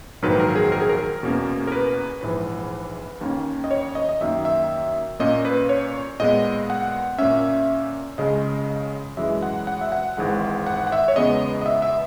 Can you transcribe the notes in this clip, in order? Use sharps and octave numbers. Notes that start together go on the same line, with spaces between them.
A#1 G#2 D#3 F#3 A#3 B4
A#4
G#4
A#4
G#4
A#4
E2 B2 A#3 C#4
A#4
B4
A#1 G#2 E3 B4
D#2 D#3 A#3 C#4
D#5
C#5
D#5
D#5
F#2 D#3 A#3 E5
E5
A#2 A#3 C#4 D#5
B4
C#5
A#2 G#3 B3 D#5
F#5
A#2 A#3 C#4 E5
C#2 C#3 G#3 C#4 D#5
F#2 E3 G#3 E5
F#5
F#5
E5
F#5
G#1 G#2 E3 G#3 F#5
F#5
F#5
E5
C#5
E2 C#3 G#3 B3 D#5
D#5
E5
E5